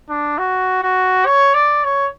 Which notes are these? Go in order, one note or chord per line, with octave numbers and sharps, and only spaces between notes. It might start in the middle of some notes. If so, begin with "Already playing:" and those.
D4
F#4
F#4
C#5
D5
C#5